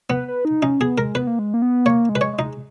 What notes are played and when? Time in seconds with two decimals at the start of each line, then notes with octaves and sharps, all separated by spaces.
0.10 B3 B4
0.28 B4
0.45 D#4
0.62 C#4 D#4
0.80 B3 G#4
0.98 G#3 A#4
1.15 B3 B4
1.27 A#3
1.39 G#3
1.54 A#3
1.62 B3
1.85 A#3 C#5
2.09 G#3
2.15 B4
2.21 C#5
2.33 G#3
2.39 D#4